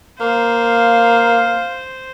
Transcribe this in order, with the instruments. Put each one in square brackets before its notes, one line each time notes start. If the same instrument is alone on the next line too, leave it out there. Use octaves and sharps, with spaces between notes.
[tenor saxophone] A#3 [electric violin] C5 [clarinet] F5